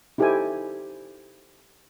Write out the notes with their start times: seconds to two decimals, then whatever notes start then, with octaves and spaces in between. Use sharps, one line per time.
0.18 D#4 E4 G4 A4 C5 G#5